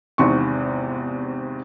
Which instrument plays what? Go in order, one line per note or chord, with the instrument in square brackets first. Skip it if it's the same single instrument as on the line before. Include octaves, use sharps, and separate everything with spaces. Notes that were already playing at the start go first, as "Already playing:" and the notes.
[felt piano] G#1 E2 G#2 C3 C6 C#6